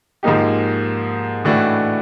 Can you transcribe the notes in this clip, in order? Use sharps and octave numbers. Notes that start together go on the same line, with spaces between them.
G#2 F3 A#3 D#4 G4
A2 E3 A3 D4 F#4